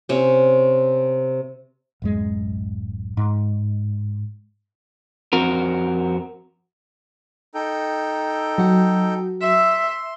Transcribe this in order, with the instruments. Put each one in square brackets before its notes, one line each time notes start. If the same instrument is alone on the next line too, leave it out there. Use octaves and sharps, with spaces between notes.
[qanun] C3 C4 C#4
[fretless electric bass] D1 F#2 G#3
G#2
[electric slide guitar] F2 C4 F#4 A#4
[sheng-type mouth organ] D#4 A4 G5
[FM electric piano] F#3 F#4
[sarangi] E5 [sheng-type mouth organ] C6